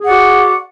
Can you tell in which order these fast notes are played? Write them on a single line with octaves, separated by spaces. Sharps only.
G#4 F#5 D5 F#4